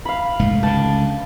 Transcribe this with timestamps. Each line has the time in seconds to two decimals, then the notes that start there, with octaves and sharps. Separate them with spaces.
0.05 F5 B5
0.39 F1 G#2 A3
0.63 C#2 D3 G5 A5